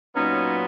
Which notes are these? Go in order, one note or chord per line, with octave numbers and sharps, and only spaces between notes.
A#2 F#3 B3 C#4 D#4